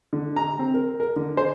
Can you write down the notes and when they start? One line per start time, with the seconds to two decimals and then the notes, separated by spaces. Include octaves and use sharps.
0.13 D3
0.36 A#5
0.59 C4
0.74 A#4
1.00 A#4
1.16 D3
1.37 C5